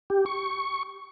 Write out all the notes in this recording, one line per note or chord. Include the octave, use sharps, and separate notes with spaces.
G4
C#6